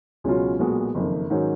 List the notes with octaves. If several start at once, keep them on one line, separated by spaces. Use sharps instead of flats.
C#2 B2 F#3 C#4 F4
B1 A#2 G#3 B3 F#4
F#1 F2 D#3
G#2 D#3 F#3 C#4